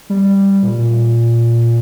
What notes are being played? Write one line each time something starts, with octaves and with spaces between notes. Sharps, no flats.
G3
A#2
A#2